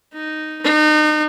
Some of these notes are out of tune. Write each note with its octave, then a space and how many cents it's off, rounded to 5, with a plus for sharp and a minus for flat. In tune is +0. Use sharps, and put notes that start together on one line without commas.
D#4 -5
D#4 -35